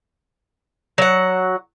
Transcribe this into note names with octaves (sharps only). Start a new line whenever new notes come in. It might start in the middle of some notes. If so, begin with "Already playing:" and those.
F#3 F#5